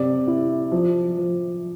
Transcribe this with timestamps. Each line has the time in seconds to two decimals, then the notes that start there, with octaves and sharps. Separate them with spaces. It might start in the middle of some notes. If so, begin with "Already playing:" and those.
Already playing: C3 D5
0.27 E4
0.72 F3
1.17 F3